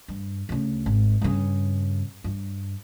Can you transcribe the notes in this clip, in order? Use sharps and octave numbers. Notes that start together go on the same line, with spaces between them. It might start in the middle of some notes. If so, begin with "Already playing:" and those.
G2
D2 C#3
G#1
G2 C#3
G2